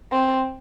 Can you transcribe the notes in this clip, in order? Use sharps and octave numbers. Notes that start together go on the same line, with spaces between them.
C4